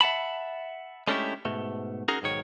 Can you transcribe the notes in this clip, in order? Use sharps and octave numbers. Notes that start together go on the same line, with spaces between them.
E5 F#5 A5 B5
G#3 A3 C#4 D4 E4 G4
G#2 B2 A3
C#4 D#4 F#4 G#4 A#4
B1 G#2 D#3 C#5